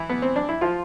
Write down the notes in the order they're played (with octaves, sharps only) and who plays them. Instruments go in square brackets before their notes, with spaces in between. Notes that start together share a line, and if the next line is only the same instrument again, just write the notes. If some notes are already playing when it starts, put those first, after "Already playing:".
Already playing: [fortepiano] E3 E4
B3
C4
D4
E4
F3 F4